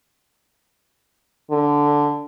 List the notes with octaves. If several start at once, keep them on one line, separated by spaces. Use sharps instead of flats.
D3